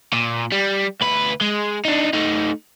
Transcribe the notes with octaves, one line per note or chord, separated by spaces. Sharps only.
A#2
G3
D2 B4
G#3
D4 D#4
A3 D#4